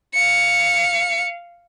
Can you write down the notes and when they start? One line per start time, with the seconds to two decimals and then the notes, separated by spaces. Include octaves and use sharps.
0.14 F5 C#7